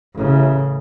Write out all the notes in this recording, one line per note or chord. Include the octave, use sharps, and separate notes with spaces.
A1 C#3